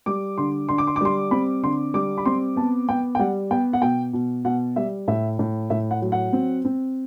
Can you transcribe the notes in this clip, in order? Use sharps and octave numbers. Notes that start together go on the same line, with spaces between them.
G3 D6
D3 C6
D3 C6
D6
C6
D6
G3 C6
C4 B5
D3 C6
G3 D6
B5
C4 C6
B3 A5
B3 G5
G5
G3 F#5
B3 G5
F#5
B2 G5
B2
B2 F#5
G3 E5
A2 E5
A2
A2 E5
F#5
F#3
F#5
C4
C4